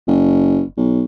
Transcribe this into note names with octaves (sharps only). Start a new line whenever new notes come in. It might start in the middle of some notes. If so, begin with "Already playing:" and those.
F#1
B1